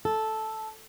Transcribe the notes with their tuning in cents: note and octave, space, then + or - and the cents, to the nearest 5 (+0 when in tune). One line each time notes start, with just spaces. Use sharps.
A4 -5